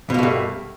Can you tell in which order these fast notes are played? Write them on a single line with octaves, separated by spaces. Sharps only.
B2 A#3 A3 G2